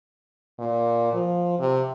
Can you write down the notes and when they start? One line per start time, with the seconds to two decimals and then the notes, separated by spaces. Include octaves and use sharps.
0.59 A#2
1.13 F3
1.59 C3